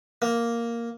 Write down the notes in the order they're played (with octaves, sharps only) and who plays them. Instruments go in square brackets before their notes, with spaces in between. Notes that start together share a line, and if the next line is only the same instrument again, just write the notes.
[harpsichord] A#3